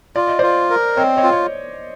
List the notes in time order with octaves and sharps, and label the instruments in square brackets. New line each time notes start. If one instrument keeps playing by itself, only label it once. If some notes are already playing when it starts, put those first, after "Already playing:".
[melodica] F4 [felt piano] D5
[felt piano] D#5
[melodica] F4 [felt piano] C5 D5
[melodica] A#4
[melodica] C4 [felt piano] C#5 D#5
[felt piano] C#5 D#5
[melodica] F4
[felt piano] C#5